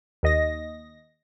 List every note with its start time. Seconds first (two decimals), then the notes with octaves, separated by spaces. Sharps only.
0.23 D#2 D#5 A#6